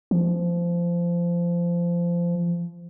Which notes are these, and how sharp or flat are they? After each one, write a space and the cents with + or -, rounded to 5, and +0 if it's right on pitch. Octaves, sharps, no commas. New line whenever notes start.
F3 -20